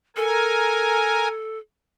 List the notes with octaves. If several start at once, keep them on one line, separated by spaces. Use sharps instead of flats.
A4 A#4 G#5